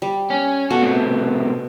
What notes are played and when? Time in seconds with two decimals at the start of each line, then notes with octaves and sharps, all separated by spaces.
0.02 G3
0.30 C#4
0.70 B2 F#4 A4 F5
0.82 A2 C3